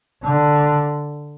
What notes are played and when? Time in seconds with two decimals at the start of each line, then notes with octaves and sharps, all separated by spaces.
0.23 D3